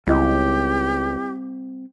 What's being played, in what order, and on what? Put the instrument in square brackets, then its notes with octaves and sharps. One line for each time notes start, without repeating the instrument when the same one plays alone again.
[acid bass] C#2 [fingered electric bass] G3 C4 [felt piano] E4 D#5 [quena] G4